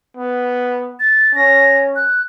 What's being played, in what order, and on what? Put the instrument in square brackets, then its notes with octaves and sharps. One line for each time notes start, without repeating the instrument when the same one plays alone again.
[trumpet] B3
[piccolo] A6
[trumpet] C#4 [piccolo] A#6
[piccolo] F#6